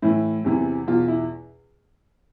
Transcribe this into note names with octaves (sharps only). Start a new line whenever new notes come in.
A2 E3 E4
E2 C3 E3
E2 B2 F4
E4